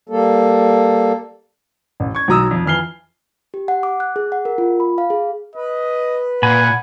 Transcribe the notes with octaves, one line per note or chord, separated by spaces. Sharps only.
G3 A#3 A4
A1
C#6 G#6
B1 F#3 A#5 D#6 E6
F2
F2 E3 F6 C7 G7
G4
F#5
D6
F#6
G#4
F#5
A#4
F4
B5
F5
G#4
B4 D#5
A#2 F#5 G#5 B5